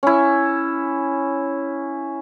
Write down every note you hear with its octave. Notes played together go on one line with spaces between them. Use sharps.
C#4 E4